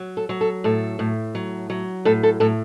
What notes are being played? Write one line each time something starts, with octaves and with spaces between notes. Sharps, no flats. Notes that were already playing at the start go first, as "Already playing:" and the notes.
Already playing: F#3
A4
F#3
A4
A2 A4
A2
F#3
F#3
A2 A4
A4
A2 A4